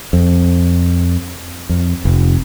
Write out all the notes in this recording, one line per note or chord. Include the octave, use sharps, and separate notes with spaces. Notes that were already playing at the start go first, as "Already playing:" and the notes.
F2
F2
F1